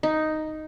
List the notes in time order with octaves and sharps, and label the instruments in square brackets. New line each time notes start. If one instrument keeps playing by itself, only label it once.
[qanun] D#4